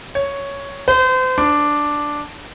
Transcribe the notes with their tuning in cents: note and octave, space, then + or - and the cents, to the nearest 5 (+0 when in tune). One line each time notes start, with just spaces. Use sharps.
C#5 +5
C5 -35
D4 +0